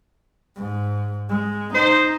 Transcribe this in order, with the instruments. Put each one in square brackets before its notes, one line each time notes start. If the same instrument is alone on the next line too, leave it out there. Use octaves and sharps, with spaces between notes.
[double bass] G#2
G#3
[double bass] D#4 [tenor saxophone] C5